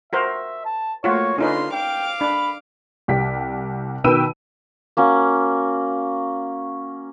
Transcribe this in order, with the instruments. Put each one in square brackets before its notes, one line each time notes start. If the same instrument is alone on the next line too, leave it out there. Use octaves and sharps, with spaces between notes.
[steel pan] F#4 A#4 C5 [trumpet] E5
[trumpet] A5
[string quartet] A3 A#3 [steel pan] F4 F#4 [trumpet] C#5
[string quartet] D3 C6 [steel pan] C#4 D#4 B4 [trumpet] F4
[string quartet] F5 D6 [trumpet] G5
[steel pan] D4 [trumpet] B5
[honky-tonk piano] C2 G4 B6
B2 D#3 B4 G5 E6 D#7
[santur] A#3 C#4 F#4